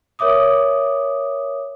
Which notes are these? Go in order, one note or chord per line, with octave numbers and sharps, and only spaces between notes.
A#4 C#5 E5 D6 D#6